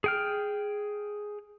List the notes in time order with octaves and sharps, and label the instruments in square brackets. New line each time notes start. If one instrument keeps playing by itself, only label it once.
[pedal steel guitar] G#4 G5 F6